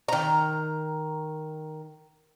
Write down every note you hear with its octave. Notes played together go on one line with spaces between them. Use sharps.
D#3 A#5